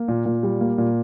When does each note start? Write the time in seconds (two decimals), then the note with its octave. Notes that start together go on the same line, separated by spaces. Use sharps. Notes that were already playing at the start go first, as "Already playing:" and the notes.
Already playing: A#3
0.08 A#2
0.26 A#2
0.43 G3
0.61 A#3
0.78 A#2